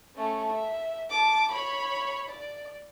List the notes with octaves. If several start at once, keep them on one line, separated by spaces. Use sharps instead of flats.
A3 C#4
E5
A5 D6
C#5 B5
D5